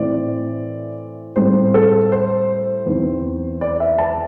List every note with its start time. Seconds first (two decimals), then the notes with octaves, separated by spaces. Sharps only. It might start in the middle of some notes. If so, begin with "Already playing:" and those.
Already playing: A2 E3 C4 D5
1.36 A2 G3 C4 C5
1.74 A4
2.12 C5
2.86 E2 E3 C4
3.61 D5
3.80 E5
3.98 A5